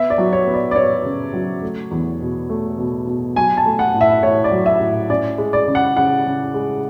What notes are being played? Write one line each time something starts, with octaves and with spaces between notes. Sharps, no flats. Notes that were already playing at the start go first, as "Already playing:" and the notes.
Already playing: B3 E5
D5
F#3
C#5
B3
D5
D5
B3 C#5
C#3
F#3
A3
E2
B2
A3
B2
B2
F#3 G#5
A5
A3
F#5
A2
E5
A2 C#5
D5
F#3
E5
A2
C#4 D5
G#3
D5
C#3
F#5
C#3 F#5
C#3
G#3